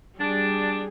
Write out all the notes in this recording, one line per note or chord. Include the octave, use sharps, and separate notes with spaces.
G3 D4 G#4